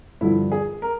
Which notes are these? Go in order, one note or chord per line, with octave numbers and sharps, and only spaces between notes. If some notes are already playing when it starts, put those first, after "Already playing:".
G2 D3 F3 E4
G#4
A#4